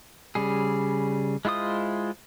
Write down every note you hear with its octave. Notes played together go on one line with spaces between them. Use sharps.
C#3 G3 G#4
G#3 E4 F4 C5 D#6